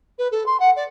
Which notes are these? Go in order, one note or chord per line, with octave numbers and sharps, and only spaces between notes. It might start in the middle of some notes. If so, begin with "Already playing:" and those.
B4
A4
C6
F#5
D5